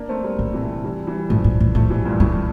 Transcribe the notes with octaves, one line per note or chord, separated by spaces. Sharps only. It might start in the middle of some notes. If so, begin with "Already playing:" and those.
Already playing: A#3 D4
A3 C4
G3 A#3
A2
C3 E3
E3 G3
E3 G3
A2 F3 A3
A2
A2
A2 F3 A3
E3 G3
G2 A#2
A2 G3